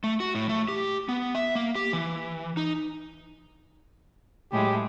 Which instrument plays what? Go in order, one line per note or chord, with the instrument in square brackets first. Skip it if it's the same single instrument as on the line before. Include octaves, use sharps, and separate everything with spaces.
[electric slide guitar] A3
F#4
A2
A3
G4
B3
E5
A#3
G4
E3
D#4
[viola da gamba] A2 F#3 G#3 [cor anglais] G4